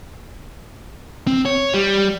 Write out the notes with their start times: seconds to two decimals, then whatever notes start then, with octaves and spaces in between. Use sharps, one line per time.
1.27 C4
1.45 C#5
1.74 G3